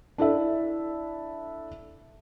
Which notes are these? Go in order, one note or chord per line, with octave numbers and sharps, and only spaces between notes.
D4 E4 A4 E5